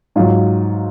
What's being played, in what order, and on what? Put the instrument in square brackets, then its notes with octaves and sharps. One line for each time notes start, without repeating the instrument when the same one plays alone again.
[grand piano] G#2 F#3 F4